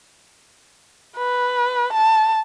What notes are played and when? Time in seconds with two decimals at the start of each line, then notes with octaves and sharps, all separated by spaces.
1.17 B4
1.93 A5